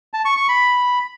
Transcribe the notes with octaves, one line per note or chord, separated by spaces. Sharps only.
A5
C#6
C#6
B5